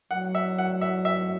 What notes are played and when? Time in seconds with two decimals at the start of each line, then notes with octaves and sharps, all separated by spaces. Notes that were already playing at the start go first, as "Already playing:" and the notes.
0.11 F#3 F#5
0.35 E5
0.58 F#5
0.81 E5
1.05 E5